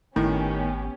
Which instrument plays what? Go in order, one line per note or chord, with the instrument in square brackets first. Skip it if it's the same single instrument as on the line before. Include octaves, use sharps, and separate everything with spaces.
[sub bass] G#1 [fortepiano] A2 [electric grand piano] D#3 [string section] B3 C#4 G4